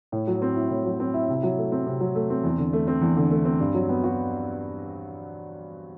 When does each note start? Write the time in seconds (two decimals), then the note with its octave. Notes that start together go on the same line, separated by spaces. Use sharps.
0.12 A2
0.28 F#3
0.42 C4
0.56 E4
0.70 A2
0.85 F#3
1.00 C4
1.14 E4
1.29 C3
1.43 F#3
1.58 A3
1.72 C4
1.86 C3
2.01 F#3
2.15 A3
2.30 C4
2.44 E2
2.58 D3
2.73 A3
2.88 C4
3.01 E2
3.17 D3
3.31 A3
3.45 C4
3.60 G2
3.74 F#3
3.89 B3
4.04 F#4